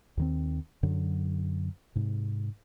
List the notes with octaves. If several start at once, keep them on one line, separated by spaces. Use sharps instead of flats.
D#2 D#3 C4
F#2 D3 F#3
G#2 C3